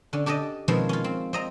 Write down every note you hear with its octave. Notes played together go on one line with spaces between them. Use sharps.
D3 C#4
D4 G4 A4 D5 D#5
B2 D#3 F3 G#3 C4 C#4
C#4 F4
C4
C4 D#5 A#5